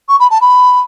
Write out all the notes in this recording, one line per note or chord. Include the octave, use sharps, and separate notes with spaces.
C#6
B5
A5
B5